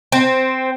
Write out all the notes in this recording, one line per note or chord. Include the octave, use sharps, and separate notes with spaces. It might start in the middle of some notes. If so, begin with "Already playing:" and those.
C4